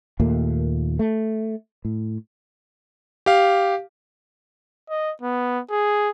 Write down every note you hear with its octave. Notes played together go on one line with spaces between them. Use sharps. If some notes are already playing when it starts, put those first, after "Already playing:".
D#2 A#2 A3 A#3
A3
A2
G4 F5
D#5
B3
G#4